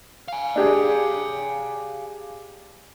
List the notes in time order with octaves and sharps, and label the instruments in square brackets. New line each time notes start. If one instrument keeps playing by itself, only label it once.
[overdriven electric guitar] F5 G#5
[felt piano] D4 G4 G#4